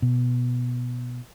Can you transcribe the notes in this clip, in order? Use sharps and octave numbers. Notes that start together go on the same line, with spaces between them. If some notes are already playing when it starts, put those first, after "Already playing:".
B2